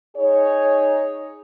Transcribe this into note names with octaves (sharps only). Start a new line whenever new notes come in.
D#4 G#4 C#5